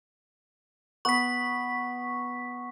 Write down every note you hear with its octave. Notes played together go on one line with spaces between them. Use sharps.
B3 C#6 B6